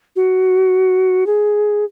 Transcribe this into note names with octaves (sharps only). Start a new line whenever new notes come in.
F#4
G#4